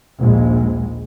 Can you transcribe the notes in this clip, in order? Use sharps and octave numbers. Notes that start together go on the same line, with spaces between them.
A#1 D#2 G#3